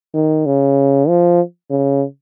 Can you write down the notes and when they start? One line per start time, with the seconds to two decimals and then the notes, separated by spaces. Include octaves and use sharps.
0.14 D#3
0.46 C#3
1.08 F3
1.70 C#3